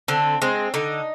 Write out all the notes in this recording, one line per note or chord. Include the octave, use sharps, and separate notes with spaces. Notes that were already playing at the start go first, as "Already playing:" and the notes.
D3 C4
G#3 C4
D3 D#4